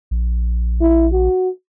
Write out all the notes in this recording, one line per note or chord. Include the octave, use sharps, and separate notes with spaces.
A#1
E4
F#4